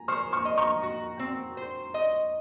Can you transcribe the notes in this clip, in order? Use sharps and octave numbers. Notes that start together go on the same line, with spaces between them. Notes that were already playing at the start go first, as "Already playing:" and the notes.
Already playing: G#5 A#5
C5 C#6 F6
C#6 F6
D#5
A#5 C#6
F#4
C4
C5
D#5